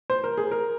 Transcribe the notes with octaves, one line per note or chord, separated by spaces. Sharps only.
C5
A#4
G#4
A#4